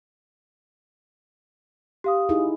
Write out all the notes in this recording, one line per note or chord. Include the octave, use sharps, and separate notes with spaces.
G4 F5 D#6
D#4 E4 G#4